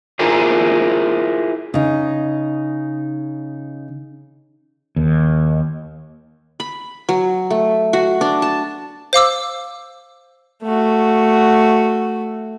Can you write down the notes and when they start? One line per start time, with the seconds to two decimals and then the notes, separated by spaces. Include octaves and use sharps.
0.19 E4 F4 G#4 A#4 C5
1.74 C#3 D#4
4.96 D#2
6.60 B5
7.09 F#3
7.50 A3
7.93 F#4
8.21 D4
8.42 A5
9.13 C5 F5 D6 E6
10.63 A3 F#4